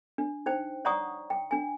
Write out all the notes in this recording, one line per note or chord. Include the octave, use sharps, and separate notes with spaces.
D4
D#4 C5 G5
C#5 D5 F#5 A#5 C#6 D#6
G5
D4 G#5